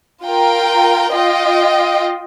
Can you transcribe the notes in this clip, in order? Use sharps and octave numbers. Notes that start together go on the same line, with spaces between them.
F4 A#4 G5
F4 D#5 G5